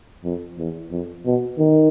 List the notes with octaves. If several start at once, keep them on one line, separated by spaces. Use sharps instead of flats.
F2
E2
F2
B2
D#3